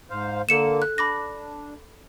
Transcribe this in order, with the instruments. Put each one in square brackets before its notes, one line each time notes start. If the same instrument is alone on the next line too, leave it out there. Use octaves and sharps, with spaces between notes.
[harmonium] G#2 C5 F5
[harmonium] D3 A#3 [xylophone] A4 C#7 E7
[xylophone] F#6
[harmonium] D4 [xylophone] B5 D6 A#6